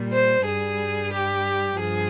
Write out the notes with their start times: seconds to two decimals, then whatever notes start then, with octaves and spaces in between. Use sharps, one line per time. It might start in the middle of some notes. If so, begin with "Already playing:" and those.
Already playing: A#2 G3
0.12 C5
0.45 G2 G3 G#4
1.12 G4
1.78 G2 F3 G#4